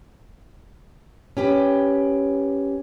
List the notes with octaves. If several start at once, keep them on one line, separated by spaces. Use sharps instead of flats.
C#4 G4 B4